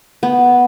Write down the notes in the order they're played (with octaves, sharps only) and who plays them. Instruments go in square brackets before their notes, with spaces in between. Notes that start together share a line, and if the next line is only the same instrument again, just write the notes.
[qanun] B3